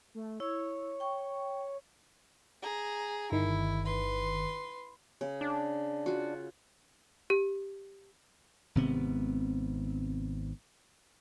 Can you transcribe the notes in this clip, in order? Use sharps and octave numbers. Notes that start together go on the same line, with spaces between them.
A3
E4 C#5 E6
G5 C#6
G#4 A#5
G1 D#3 E4
B4 C6
C#3
D4
F4 F#4
G4
G#1 C3 B3